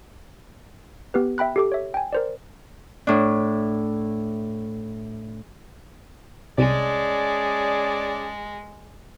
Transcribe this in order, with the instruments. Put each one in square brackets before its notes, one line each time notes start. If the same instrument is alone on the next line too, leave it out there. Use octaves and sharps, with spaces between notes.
[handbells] B3 G4 B4
E5 G5 B5 F#6
G4 A4 D6
C#5 E5
G5 G#5
A#4 C5 D5
[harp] A2 D4
[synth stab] C2 [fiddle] G#3 [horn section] C#4 G#4 A5 [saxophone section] D5